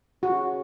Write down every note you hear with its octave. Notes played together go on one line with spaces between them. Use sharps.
C#3 F#4